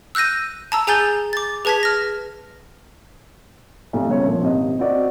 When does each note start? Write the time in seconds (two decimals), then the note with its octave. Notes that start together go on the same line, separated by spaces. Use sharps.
0.15 E6 F#6 G6 A#6 D#7
0.72 A5 A#5 E6
0.87 G#4 G#5 A#5 G6 A6 G7
1.33 D6 A6
1.65 G#4 B4 A5 G#6 B6
1.83 F6 A#6
3.93 B1 F2 C3 A3
4.09 G1 C#2 C4 C#5
4.26 A#2 F3
4.41 G#1 C3 D#5
4.79 C4 F#4 D5 D#5